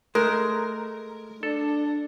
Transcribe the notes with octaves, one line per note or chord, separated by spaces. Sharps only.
G#3 A3 A#4
D4 A4